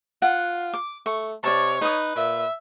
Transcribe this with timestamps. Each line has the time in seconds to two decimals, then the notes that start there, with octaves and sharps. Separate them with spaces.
0.22 F4 F#5
0.74 D6
1.06 A3 C#6
1.44 C3 C#5 D5 A5
1.81 D#4 B4 D#6
2.16 A#2 E5